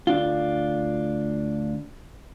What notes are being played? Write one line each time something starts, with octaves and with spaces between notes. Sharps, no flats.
D2 D4 F4